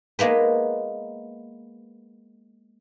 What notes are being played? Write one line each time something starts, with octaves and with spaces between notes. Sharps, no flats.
G#3 A#3 B3 B4